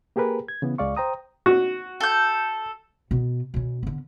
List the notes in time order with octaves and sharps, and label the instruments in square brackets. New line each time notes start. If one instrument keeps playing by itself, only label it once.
[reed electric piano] A#3 G4 G#4 A#4 B4
G#6
C#3 E3 B3
C#2 G#3 D5 F5 C#6
C5 G5 A#5 D#6
[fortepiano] F#4
[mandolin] A4 G6
[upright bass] B2 B3
B2 C#4
D3 B3